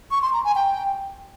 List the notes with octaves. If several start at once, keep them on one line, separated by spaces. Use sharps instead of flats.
C#6
C6
A#5
G#5
G5